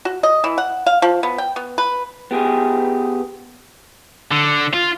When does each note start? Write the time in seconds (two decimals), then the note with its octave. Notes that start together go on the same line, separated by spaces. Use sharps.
0.05 F#4
0.23 D#5
0.44 E3
0.58 F#5
0.86 F5
1.02 F3
1.23 B3
1.38 G5
1.56 B3
1.78 B4
2.31 B3 G4 G#4
4.32 D3
4.74 F4